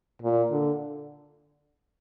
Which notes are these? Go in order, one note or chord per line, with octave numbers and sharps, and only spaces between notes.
A#2
D3